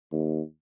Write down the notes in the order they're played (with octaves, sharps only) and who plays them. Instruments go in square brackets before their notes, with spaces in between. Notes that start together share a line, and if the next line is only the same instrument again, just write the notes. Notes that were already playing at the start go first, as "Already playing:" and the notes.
[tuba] D#2